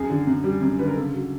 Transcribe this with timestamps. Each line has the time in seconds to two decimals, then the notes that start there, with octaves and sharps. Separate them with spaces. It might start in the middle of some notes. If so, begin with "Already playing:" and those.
Already playing: F#2 G#4
0.10 D3
0.27 F#2
0.44 G3
0.61 F#2
0.79 D3 B4
0.87 A#4
0.96 C#3 A4
1.14 F#3